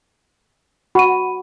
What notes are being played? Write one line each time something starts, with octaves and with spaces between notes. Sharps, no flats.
F#4 B5 D#7